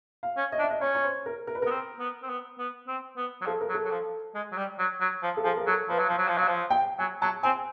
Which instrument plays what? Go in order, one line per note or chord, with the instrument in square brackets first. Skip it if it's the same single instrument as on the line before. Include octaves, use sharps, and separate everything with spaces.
[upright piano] F5
[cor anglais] C#4
[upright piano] D#5
[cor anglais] D4
[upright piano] E5
D#5
[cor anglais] C#4 [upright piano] C#5
[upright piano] C#5
C5
A#4
A#4
B4
[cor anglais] B3 [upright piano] A#4
[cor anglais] C4
B3
C4
B3
B3
C4
B3
F#3
[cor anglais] F3 [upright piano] A4
[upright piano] A#4
[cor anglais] F#3
[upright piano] A4
[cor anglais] F#3
F3
G#3
F#3
G3
F#3
F#3
F3
[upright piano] A4
[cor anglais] F3 [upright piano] G#4
[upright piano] A#4
[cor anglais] F#3 [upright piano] A4
[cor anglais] F3 [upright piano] B4
[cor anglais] F#3
[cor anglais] F3 [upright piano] C5
[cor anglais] F#3
F3
[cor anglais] F#3 [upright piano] F5
[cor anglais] F3
[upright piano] G5
[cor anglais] F#3 [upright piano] G#5
[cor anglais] F#3 [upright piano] A5
[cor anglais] C4 [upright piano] G#5